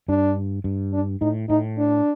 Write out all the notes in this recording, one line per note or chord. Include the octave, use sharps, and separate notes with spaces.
G2 D4
G2
D4
A2 D#4
A2 D#4
D4